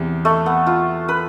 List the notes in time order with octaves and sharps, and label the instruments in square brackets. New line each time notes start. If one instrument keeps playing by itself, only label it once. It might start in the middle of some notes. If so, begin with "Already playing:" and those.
Already playing: [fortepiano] E2 C3
[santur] A3
B3
F4
B4